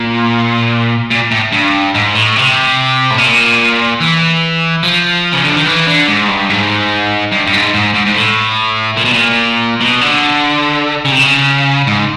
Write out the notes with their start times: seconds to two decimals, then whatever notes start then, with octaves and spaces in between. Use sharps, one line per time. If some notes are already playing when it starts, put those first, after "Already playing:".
Already playing: A#2
1.11 A#2
1.32 A2
1.53 G2
1.95 G#2
2.15 A2
2.36 C3
3.10 A2
3.18 A#2
4.00 E3
4.83 F3
5.33 C#3
5.44 D3
5.55 D#3
5.66 E3
5.87 D3
6.08 G#2
6.28 G2
6.49 G#2
7.32 G2
7.47 G2
7.53 G#2
7.74 G#2
7.94 G#2
8.06 G#2
8.15 A2
8.97 A#2
9.05 B2
9.13 A#2
9.81 B2
10.01 D3
11.05 C#3
11.12 C3
11.19 C#3
11.87 G#2